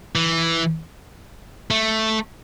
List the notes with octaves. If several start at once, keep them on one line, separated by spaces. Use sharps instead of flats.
E3
A3